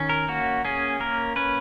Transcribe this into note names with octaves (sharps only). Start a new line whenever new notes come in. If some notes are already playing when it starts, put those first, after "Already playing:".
Already playing: D#3 C#4
A#4
A#3 F#4
C#4 G#4
A#3 A#4
C#4 B4